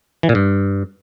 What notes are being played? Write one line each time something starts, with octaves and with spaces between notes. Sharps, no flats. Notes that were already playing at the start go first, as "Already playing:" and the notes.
E3
A#2
G2